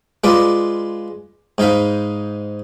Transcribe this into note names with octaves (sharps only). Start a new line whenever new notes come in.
G#3 F4 B4 D5
G#2 D#4 F5 B5